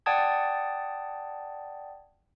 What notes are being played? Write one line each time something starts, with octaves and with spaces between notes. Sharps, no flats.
D5 F#5 G5 A5 D#6 G#6